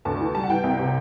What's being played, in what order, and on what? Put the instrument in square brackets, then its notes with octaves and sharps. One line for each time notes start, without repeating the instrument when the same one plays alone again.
[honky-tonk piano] D2 A5
E3
G3 A5
F#5
E3 G5
C2
C3